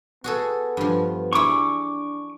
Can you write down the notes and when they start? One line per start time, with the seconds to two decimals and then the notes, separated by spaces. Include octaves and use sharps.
0.24 B3 F#4 G#4 A4
0.77 G2 F3
1.33 D4 E4 G#4 C#6 D6